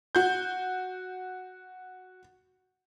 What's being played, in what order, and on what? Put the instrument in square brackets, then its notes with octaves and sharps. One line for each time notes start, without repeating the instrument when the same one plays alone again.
[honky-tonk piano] F#4 G6